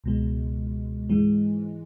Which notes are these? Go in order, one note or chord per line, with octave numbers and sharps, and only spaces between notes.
C#2 B2 G#3
G#2 E3 G#3